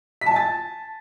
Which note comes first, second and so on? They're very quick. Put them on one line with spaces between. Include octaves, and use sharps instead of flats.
B6 A5 G#5 A6